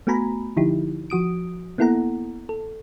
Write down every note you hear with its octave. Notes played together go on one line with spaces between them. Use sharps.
A3 B3 F#4 G#5 A#5 B5
D3 F3 D#4 E4 G4
F3 F#4 D#6 D7
A#3 B3 E4 A4 F#5 A#5
A4